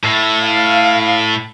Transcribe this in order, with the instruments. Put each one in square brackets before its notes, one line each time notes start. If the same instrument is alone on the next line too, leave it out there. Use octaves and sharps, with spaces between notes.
[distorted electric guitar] A2
[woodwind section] F5